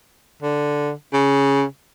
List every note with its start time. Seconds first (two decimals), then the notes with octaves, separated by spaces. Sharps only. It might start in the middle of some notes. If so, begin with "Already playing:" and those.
0.42 D3
1.13 C#3